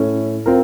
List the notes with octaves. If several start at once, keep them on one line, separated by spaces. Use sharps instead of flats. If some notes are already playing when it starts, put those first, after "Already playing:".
Already playing: A2 A3 C#4
C4 F4 A#4